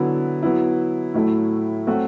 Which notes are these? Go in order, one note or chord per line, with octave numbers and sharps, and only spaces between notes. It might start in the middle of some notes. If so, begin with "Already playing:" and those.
Already playing: D3 F#3 B3 E4
F#3 B3 E4
A2 F#3 A3 E4
F#3 A3 C4 F#4